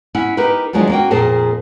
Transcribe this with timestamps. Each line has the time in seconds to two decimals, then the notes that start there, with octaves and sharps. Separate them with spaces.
0.15 C#4 E4 F#5
0.37 D#4 G4 A#4 B4
0.73 D#2 F3 F#3 G#3 D4 F4
0.89 A#3 C#4 F#4 G5
1.11 F2 A#2 G#4 A#4 C5 A5